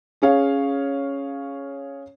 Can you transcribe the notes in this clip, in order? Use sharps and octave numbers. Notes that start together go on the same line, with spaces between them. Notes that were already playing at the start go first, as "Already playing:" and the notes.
C#4 G#4 C#5 F5